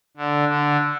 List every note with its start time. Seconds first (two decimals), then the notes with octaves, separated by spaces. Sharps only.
0.17 D3
0.48 D3